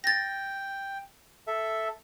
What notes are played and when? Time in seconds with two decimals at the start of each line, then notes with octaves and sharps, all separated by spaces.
0.04 G5 A6 A#6
1.47 A4 E5